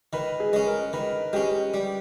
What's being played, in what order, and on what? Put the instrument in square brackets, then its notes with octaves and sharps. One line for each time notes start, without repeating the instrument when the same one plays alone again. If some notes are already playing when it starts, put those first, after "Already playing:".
[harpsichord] D#3 [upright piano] B4
[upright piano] G#4
[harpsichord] G#3 C#4
[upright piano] A#4
[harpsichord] D#3 [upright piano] B4
[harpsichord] G#3 C#4 [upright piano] G4
[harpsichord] G3